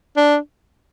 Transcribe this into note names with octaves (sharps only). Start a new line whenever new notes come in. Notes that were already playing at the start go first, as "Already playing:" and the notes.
D4